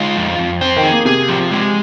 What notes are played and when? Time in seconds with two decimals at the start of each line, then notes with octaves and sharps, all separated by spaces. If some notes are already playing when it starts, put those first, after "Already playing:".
Already playing: G#3 D#4 F4
0.17 F2
0.39 F2
0.61 C4 C5
0.76 D#3
0.83 G#4
0.91 A#3
1.05 C3 G#4
1.29 F3
1.51 G#3